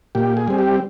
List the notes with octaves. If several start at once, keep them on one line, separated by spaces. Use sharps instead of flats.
A#2 G4
G#4
G3 C4
G4